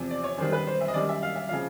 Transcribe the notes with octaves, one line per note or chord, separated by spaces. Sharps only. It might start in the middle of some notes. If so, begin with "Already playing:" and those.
Already playing: E2 C3 F3
D5
C#5
F#2 D#3 G3 C5
B4
C5
E5
D#5
F#2 D#3 G3 D5
E5
F5
E5
C#3 F3 F5